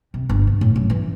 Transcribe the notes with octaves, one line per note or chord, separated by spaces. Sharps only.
C3
G1
B3
A2
F#2
E3